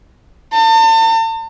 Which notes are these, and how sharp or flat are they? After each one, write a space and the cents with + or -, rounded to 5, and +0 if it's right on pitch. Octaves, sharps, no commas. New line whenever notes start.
A5 +40